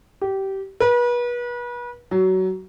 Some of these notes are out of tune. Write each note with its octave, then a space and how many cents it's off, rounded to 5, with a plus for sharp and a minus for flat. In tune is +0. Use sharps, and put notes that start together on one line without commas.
G4 -20
B4 -35
F#3 +20